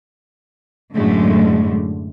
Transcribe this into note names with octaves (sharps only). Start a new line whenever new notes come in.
F#2 A2 D3 G#3 A3